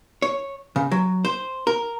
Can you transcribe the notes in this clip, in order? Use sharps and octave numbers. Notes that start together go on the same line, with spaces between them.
C#5
C#3
F#3
C5
A#4